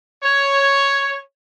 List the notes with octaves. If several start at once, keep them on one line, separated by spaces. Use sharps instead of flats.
C#5